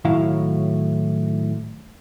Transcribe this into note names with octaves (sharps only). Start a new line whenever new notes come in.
A2 D#3 F#3 E4 F5